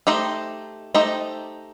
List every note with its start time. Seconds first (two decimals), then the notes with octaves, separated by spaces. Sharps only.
0.07 A3 D#4 G4 C5 D#5
0.94 A3 D#4 G4 C5 D#5